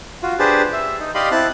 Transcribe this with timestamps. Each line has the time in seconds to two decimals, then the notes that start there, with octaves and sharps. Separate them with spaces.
0.23 F4 F#4
0.39 D4 G4 G#4 B4 C5 A5
0.73 E5
1.00 D#4
1.15 G4 D5 D#5 F5 B5 C6
1.31 C4 E4 A5 F#6